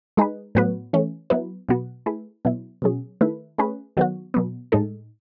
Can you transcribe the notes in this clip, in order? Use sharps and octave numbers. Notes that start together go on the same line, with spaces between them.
G#3 D#4 G#4 B4
A2 F#3 B3 F#4 B4
E3 A3 C#4
F#3 B3 E4 B4
B2 F#3 B3 F#4
A3 E4 G#4 B4
B2 F#3 B3 E4
B2 F#3 C#4 G#4
D#3 A3 E4 B4
A3 C#4 G#4 B4
D#3 F#3 B3 F#4
B2 F#3 B3
A2 G#3 D#4 A4